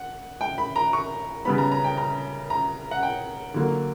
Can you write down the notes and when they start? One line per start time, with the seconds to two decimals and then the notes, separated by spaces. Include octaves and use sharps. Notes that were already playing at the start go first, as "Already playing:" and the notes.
Already playing: F#5
0.41 G5
0.58 B5
0.76 A#5
0.93 C#6
1.45 C#3 G3 B3 B5
1.58 A#5
1.72 A#5
1.84 G5
1.97 A#5
2.50 A#5
2.91 F#5
3.03 G5
3.54 D3 F#3 A#3